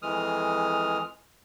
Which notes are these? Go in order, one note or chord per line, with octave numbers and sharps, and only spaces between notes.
F2 E3 G#3 D#6 F6